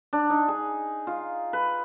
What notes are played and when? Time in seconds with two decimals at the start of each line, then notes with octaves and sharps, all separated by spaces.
0.13 D4
0.30 D#4
0.48 G#4
1.07 F4
1.53 B4